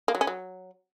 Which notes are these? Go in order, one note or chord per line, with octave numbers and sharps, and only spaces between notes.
A#3
F#3
C#4
F#3